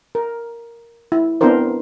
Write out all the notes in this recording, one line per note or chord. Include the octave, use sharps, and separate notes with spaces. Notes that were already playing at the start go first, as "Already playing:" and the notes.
A#4
E4
B3 C4 D4 E4 A#4 C5